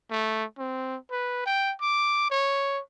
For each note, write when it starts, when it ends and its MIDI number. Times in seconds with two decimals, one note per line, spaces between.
0.11 0.45 57
0.58 0.97 60
1.11 1.42 71
1.46 1.74 79
1.81 2.27 86
2.31 2.81 73